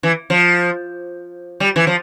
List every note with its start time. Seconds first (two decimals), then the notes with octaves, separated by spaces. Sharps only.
0.03 E3
0.30 F3
1.60 G3
1.76 E3
1.87 F3